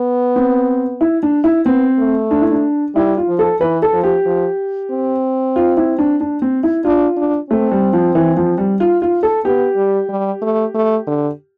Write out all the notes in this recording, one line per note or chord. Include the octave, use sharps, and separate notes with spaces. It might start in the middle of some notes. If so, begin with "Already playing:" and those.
Already playing: B3
C4
E4
D4
E4
B3 C4
A3
D4
E4
D4
G3 E4
F4
F3
A4
E3 B4
A4
F3
G4
F3
C4
F4
E4
D4
D4
C4
E4
D4 F4
D4
A3 C4
G3
F3
E3
F3
G3
F4
F4
A4
B3 G4
G3
G3
A3
A3
D3